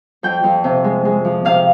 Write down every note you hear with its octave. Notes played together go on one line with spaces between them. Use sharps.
F2 G5
F2
C3
G#3
G#3
F3
C3 F5